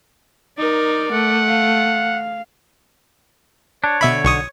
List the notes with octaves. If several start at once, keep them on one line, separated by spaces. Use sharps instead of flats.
D#4 A#4 D5
A3 F#5
F5
D4 C#5
B2 D3 E5 B5
B1 C#6 D#6